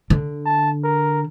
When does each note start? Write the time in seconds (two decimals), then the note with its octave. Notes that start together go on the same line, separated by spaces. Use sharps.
0.10 D3
0.46 A5
0.84 A#4